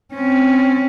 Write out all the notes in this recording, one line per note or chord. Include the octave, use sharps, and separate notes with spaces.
C4 C#4